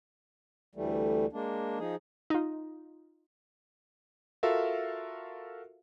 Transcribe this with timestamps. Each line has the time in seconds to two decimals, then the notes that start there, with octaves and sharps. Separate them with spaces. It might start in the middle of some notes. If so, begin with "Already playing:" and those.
0.75 D2 E3 G3 A3
1.33 G#3 A#3 D4
1.79 F3 D#4 G#4
2.30 D#4 F4
4.43 F4 F#4 A4 A#4 E5 F5